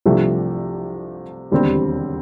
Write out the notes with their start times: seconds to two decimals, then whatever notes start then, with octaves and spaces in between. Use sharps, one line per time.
0.06 C2 C3 F3 A3 D4
1.52 E1 D#2 D3 G3 C4